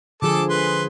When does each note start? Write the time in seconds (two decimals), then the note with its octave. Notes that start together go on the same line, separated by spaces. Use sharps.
0.22 D3 F3 G#4 A4 A5 D6
0.50 B4 C6